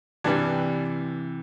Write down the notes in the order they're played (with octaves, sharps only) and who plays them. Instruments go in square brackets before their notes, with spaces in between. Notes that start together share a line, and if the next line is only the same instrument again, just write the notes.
[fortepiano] G2 G3 D4 [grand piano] C3 E3